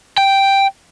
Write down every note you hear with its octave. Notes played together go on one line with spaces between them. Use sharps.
G5